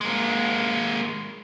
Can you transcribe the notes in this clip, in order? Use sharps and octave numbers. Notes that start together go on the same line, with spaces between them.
G#3 A#3